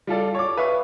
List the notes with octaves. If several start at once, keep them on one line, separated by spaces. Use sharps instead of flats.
G3 F4 A4 D5
C#5 D6
B4 E5 F5 C#6